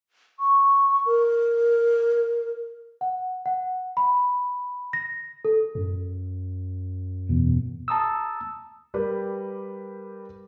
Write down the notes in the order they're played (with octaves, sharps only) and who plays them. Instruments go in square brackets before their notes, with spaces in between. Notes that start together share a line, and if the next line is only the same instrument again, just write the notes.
[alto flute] C#6
A#4
[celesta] F#5
F#5
B5
A#6
A4
[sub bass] F#2
[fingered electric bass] E2 B2
[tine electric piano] A5 A#5 D#6 E6
[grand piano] G3 G4 A#4 B4